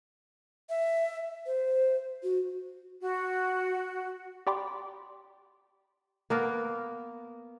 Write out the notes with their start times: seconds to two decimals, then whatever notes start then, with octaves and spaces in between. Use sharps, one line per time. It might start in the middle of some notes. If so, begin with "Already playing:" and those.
0.70 E5
1.46 C5
2.23 F#4
3.02 F#4
4.47 G4 D5 G5 B5 C6 D6
6.30 A#3 B3 A#4